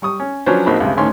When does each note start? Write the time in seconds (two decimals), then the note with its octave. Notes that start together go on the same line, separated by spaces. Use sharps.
0.02 G3 C#6 D#6
0.20 C#4
0.46 F3 F#3 C#4 D4 B4 C5
0.66 A#1 C4 D#4 F#4 A#4 B5
0.80 C#2 G2 C3
0.97 D2 A2 D#3 C#4 C6